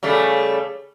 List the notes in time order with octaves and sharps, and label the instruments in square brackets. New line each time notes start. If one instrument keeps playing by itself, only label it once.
[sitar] C#3 G3 A3